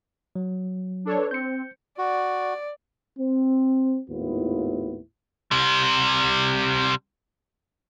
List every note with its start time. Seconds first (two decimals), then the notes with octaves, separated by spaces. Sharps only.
0.36 F#3
1.05 D4 A4 C#5
1.18 B4
1.31 C4 G6 C#7
1.98 F#4 D5
3.18 C4
4.10 G#1 D#2 A2 B3 E4 F4
5.51 C3 G3